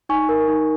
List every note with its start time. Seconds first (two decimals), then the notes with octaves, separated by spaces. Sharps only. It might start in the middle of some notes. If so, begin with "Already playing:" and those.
0.09 D#4 G#5 C#6
0.29 A#4
0.48 D#4